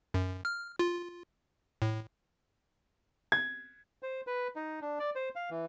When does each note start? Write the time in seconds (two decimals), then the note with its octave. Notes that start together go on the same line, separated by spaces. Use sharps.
0.14 F#2
0.45 F6
0.79 F4
1.82 A2
3.32 G#6
4.03 C5
4.27 B4
4.56 D#4
4.82 D4
4.99 D5
5.15 C5
5.36 F5
5.50 E3